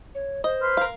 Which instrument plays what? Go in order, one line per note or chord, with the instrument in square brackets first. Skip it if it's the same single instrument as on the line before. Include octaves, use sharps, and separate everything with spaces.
[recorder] C#5
[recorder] C5 [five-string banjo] D#5
[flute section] B4 C6 F6
[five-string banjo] A#4 F5